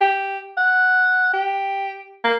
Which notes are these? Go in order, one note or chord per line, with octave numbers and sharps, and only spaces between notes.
G4
F#5
G4
A#3